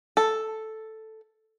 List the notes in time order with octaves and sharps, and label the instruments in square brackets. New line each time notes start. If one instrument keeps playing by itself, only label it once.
[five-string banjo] A4